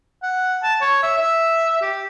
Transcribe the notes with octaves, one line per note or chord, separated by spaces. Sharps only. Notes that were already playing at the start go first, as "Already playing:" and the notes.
F#5
A5
C#5
E5
E5
G4